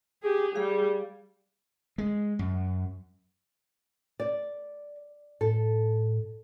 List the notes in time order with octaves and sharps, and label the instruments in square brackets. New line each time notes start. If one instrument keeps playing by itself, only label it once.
[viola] G4 G#4
[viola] G3 [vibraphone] G#4 F5
[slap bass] G#3
F#2
[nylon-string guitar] D5
[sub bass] A2 [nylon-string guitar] A4